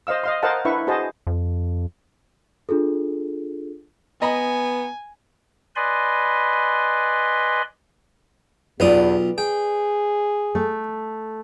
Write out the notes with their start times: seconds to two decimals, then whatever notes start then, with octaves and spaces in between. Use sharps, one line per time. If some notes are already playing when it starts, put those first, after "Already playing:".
0.07 C5 D#5 F5 E6
0.23 D#5 F5 C6
0.43 A#4 C5 D#5 F5 F#5 A5
0.65 D4 E4 B4 E5 C#6
0.87 F#4 G#4 C5 D#5 A5
1.27 F2
2.69 D4 F4 G#4 A4
4.22 B3 D#5 G#5 A#5 B5
5.76 B4 D5 D#5 G#5 B5 C6
8.80 B1 E2 F4 B4 D5 D#6
9.38 G#4 G5
10.55 A3